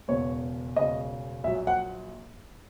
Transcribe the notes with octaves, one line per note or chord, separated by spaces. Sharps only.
E1 E2 C#3 C#5
E1 E2 C#3 D#5
A#1 A#2 F#3 E5
F#5